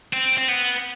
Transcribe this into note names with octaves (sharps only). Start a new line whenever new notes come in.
C4
C4
B3